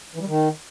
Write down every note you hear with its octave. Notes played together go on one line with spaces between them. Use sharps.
E3
G3
D#3